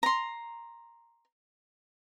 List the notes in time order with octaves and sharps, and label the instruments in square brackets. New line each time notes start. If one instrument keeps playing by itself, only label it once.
[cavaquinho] A#5 C6